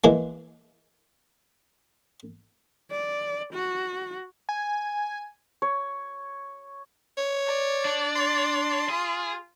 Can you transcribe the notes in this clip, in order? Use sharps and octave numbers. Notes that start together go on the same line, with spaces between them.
E3 G#3 A#3
D5
F#4
G#5
C#5
C#5
D5
D4
C6
F4 G#4